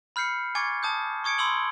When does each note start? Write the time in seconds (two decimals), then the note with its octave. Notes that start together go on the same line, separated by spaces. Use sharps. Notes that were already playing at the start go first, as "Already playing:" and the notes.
0.16 B5 F6 G6 C7 C#7
0.55 G#5 C#6 D6 G#6 A6 C#7
0.83 A5 D#6 G6
1.24 C#6 D#6 G#6 C#7 D7
1.38 B5 C6 D#6 E6 F#7 G7